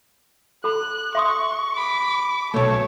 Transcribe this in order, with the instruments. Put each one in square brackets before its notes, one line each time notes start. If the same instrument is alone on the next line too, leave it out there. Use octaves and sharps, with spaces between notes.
[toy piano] A4 B5 [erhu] F#6
[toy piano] E5 C6 D#6 [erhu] C#6
[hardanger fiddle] B5 [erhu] D6
[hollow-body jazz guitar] B1 A3 [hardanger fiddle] C#5 [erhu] A5